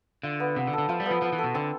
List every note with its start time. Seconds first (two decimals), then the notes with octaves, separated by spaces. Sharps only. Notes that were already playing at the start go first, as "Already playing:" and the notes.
0.23 D3 F4
0.40 B3
0.56 C3 B3
0.67 D3
0.73 A4
0.78 D3
0.89 F3 F4
1.00 G3
1.06 F3 B3
1.22 F3 B3
1.33 E3
1.39 B2 A4
1.54 D3 C4